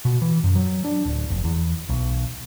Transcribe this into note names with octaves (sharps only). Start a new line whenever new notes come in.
B2
E3
F#2
F#3
D4
D1
F1
E2
B1